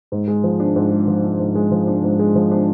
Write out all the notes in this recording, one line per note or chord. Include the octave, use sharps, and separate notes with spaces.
G#2
G#3
F3
D4
G#2
G#3
F3
D4
G#2
G#3
F3
D4
G#2
G#3
F3
D4